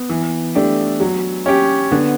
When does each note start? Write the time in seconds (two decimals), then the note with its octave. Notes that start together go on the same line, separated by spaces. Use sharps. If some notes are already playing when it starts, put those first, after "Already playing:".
Already playing: B3
0.09 E3
0.55 A3 D4 G4
1.00 F#3
1.46 C#4 G4
1.92 D3 B3